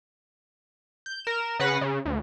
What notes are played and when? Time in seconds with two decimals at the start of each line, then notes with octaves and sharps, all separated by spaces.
1.06 G6
1.25 A#4 E7
1.59 C#3 B4 F#5 A#6 C7
1.81 C#3
2.05 D2